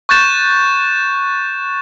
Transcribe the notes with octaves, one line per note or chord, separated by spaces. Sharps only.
C#6 F#6 G6 A6 E7